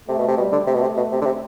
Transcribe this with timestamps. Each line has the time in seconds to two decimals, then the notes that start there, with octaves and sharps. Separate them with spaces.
0.09 C3 A3
0.18 B2
0.28 C3
0.37 B2 G3
0.52 D3
0.67 C3 A3
0.74 B2
0.81 C3
0.97 B2
1.12 C3
1.22 D3
1.25 C3